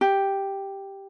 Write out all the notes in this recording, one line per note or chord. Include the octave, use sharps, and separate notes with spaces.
G4